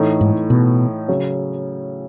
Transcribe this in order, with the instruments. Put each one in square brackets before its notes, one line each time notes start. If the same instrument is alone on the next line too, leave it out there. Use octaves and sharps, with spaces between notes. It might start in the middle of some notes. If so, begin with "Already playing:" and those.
Already playing: [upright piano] A2 E3 A3 D#4 A4
[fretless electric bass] G#2
B2
[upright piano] C#3 F#3 C#4